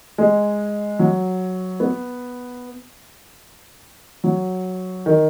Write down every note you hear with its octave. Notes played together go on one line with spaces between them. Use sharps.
G#3
F#3
B3
F#3
D#3